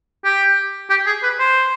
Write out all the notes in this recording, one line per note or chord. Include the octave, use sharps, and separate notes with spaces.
G4
G4
G#4
B4
C5